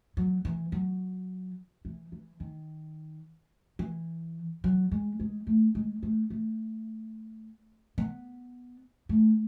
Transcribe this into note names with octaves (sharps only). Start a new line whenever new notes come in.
F#3
E3
F#3
E3
E3
D#3
E3
F#3
G#3
G#3
A3
G#3
A3
A3
B3
A3